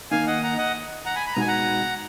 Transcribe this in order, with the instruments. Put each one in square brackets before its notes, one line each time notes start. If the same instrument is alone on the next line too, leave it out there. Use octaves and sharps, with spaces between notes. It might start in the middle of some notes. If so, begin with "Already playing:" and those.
[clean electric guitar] D#3 A#3 D#4 [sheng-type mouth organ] F5 G#5
[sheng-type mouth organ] D#5 F#5
F#5 A#5
D#5 F#5
F#5 A#5
G#5 B5
B5
A#5
[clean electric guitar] B2 G#3 B3 D#4 F#4 [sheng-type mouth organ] G#5
[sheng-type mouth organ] F#5 A#5